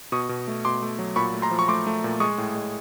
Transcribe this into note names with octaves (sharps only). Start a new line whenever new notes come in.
B2 C#6 D#6
B2
A3
B2 C6 D6
A3
F#3
A#2 B5 C#6
A3
A#5 C6
F3
C#6
A3 C6 D6
A3
A#2
G#3 C#6 D#6
A2
G#3